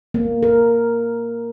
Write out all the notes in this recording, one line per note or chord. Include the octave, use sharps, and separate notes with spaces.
A#3
A#4